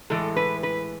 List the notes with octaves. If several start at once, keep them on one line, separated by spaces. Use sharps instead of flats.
A2 E3 G#3 A4
B4
B4